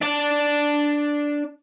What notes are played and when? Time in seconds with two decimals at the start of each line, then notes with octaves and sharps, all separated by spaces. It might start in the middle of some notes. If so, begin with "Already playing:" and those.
0.02 D4 D5